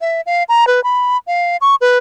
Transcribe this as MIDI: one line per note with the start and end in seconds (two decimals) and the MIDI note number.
0.01 0.21 76
0.26 0.43 77
0.49 0.67 82
0.67 0.83 71
0.84 1.17 83
1.27 1.57 77
1.61 1.75 85
1.81 1.98 71